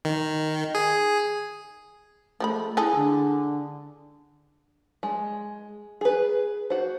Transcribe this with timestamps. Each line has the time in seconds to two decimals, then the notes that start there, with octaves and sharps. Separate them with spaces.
0.05 D#3
0.75 G#4
2.40 F3 G#3 A3 B5
2.77 G#3 E4 G#4 A4
2.95 D3
5.03 G#3
6.01 G#4 B4
6.70 F#4 C5